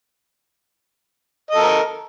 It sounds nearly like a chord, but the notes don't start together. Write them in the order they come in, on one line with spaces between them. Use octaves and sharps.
D#5 A4 A#4